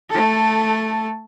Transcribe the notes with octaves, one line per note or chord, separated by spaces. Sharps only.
A3 A4